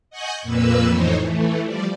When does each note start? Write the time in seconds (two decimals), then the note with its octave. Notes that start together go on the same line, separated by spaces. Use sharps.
0.10 D#5 F#5 G#5 C#6 F#6 G6
0.42 F2 A#2 A#3 B4 E6
0.88 F2 A2 E3 D#4 C5 C#5
1.21 E3 A3
1.63 F3 G3 D5